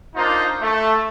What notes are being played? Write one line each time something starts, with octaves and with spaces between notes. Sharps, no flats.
A#3 D4 D#4 F4 C5
A3